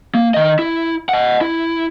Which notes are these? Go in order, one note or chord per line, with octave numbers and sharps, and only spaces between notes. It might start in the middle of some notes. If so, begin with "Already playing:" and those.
A#3
D#3 D#5
E4
D#5 F#5
E4